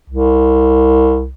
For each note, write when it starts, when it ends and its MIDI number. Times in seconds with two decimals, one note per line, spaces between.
0.10 1.33 36